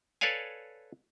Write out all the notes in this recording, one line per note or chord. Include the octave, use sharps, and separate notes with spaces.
A4 B4 C#5 D5 F5 G#5